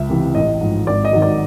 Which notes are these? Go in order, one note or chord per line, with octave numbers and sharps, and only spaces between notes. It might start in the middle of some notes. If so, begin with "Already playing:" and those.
Already playing: C#2 E5
C3 E3
A1 D#5
G#2 F3
G#1 D5
D#5
G#2 D#3 F#3
D5